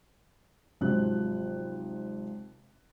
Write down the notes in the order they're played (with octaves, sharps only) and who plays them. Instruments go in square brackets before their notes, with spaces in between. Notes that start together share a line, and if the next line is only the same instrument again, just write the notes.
[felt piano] G#1 C3 F3 F#3 F#6